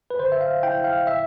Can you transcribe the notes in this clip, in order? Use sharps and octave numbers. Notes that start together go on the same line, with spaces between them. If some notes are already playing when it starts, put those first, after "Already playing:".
B4
D3 C5
E5
F5
E4 G5
F5
E5